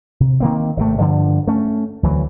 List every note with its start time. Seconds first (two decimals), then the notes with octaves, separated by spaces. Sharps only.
0.20 C3
0.40 D#3 A#3 C4
0.77 G#1 C3 A3
1.00 G2 D3 F3
1.47 A3 C#4
2.03 D2 E3 F#3